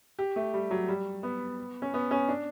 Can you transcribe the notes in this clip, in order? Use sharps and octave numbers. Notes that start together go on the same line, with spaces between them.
G4
A3
G3
F#3
G3
B3
C#4
B3
C#4
D4